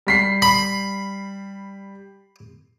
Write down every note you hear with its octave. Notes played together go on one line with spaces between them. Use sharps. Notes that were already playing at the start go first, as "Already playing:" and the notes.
G3 B6 C7
B5